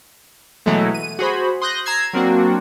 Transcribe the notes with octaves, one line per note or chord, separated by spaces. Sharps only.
B2 E3 F#3 G#3 A3
D#7
F#4 G#4 C5 B5
C6 D#6 F#6 G6 A#6
A#5 E6 G#6 C7
F#3 A#3 C4 D4 F#4